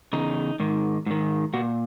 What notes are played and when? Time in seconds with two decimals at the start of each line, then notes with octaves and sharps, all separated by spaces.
0.13 E2 C#3 D#4
0.60 G#2 D#3
1.06 G#2 D#3
1.54 A#2 F#4